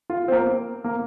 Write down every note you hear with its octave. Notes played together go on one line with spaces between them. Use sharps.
F4
C4
A#3
A#3